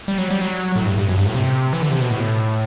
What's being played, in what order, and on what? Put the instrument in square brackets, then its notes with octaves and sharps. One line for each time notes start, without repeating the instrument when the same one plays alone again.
[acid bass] G3
F#3
G3
F#3
A2
G2
G2
F#2
G2
A2
C3
E3
D3
C3
B2
A2